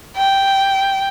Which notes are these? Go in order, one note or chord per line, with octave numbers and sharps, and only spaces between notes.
G5